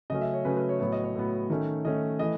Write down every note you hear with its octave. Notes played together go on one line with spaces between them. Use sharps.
C#3 F#3 A3 C#4 D#5
E5
C#5
C#3 F#3 A3 C#4 B4
B4
C#5
A2 F#3 B3 C#5
D#5
C#5
A2 F#3 B3
D#3 A3 C#4
D#3 A3 C#4 D#5
E3 A3 D#5